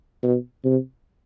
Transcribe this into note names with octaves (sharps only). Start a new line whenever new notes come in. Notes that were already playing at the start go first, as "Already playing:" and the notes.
B2
C3